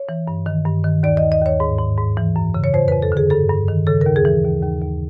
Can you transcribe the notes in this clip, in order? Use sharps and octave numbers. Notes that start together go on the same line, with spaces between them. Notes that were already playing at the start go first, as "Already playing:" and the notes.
Already playing: C#5
E3
G2
D#3
G2
D#3
D#2 D5
D#2 D#5
D#5
D#2 C#5
G#2
G#2
G#2
E3
F#2
C#3
C#5
F2 C5
F2 B4
A4
D3
G#4
G2 A4
G2
D#3
C#3 A4
D#2 A#4
G#4
E3
D#2
D#2
D#2